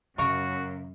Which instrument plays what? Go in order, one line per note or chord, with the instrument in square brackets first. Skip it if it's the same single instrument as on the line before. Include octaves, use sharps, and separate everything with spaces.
[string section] F#2 [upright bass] C#3 [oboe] F#4 [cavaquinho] A#4 F5 C#6